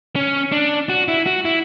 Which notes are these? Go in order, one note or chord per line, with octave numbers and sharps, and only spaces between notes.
C#4
D4
F#4
E4
F#4
E4